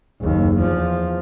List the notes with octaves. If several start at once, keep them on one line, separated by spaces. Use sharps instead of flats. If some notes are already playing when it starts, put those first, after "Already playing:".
F#1 D#2
E2 F3